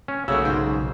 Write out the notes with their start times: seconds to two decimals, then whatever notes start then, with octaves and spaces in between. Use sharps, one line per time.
0.08 C#4
0.28 B1 C#3 A3 A#3 F#4 C#5 E6
0.45 G#2 C5 D#5